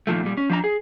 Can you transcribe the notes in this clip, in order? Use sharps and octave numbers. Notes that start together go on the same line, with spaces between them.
A#2 D#3 F3 A3
A#2 G3
C#4
F3 D4 A#5
G#4